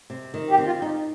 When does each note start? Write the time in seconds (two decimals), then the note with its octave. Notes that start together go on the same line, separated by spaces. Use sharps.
0.10 C3
0.34 D#3
0.50 G4
0.58 C4
0.66 F4
0.82 D#4